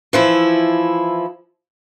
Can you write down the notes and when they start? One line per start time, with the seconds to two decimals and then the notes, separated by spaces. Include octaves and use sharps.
0.13 E3 F3 E4